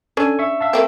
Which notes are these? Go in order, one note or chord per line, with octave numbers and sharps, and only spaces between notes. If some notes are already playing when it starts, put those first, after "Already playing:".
C#4 D4 A4 G#5
E5 C#6
E5 F5 A5
A3 A#3 C4